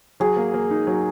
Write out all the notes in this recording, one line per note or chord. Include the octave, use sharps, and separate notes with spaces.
F#3 G#4
A#3
A#3
D#4
F#3